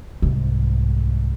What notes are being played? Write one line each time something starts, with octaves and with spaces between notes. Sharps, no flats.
C2 G#2